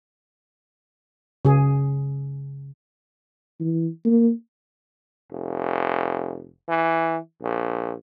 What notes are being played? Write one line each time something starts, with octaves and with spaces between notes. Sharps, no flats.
C#3 G#4
E3
A#3
F1
E3
A#1